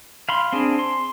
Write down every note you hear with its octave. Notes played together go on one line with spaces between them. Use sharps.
F5 B5 C6
C4 D4 G#4
C6